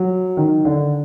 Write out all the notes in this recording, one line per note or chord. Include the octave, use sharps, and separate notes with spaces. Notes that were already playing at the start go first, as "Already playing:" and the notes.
Already playing: F#3
D#3
D3